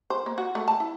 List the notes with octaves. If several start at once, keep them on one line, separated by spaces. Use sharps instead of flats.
C5
A#3
F#4
A3
A5
E4